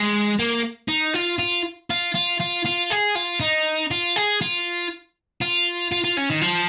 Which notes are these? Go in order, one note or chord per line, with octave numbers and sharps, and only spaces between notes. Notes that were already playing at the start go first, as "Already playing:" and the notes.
Already playing: G#3
A#3
D#4
F4
F4
F4
F4
F4
F4
G#4
F4
D#4
F4
G#4
F4
F4
F4
F4
C#4
D#3
F3